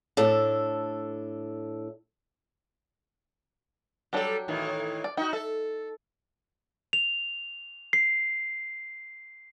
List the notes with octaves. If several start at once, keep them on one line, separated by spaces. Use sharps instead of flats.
A2 D4 A4
F#3 G3 D4 G4 A4
A2 D#3 E3
D5
D#4 F#4 G5
A4 E5
F7
C7